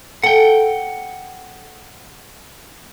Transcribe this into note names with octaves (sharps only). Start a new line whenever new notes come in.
A4 F#5 G5